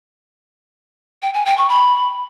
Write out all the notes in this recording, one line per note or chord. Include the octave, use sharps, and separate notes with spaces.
G5
G#5
G5
C#6
B5